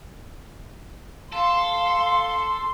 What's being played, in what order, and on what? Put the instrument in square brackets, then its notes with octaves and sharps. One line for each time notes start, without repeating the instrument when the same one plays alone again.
[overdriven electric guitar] A4 [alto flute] F5 [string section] C6